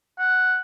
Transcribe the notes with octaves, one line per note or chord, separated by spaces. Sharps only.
F#5